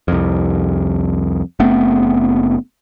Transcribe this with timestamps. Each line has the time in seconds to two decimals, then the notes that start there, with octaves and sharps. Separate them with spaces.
0.08 C2 F2
1.59 F#1 A3 B3 C4